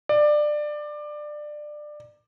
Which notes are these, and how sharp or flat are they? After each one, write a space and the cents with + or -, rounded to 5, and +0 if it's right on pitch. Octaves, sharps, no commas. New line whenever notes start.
D5 +20